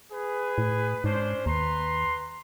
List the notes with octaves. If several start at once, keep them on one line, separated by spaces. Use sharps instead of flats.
G#4 B4
A2
G#2 C#4 D4 C5
D#2 B4 A#5 C6